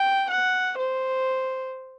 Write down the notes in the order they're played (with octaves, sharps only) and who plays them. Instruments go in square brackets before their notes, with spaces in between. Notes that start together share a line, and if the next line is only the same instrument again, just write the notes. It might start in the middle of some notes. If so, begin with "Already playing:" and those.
Already playing: [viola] G5
F#5
C5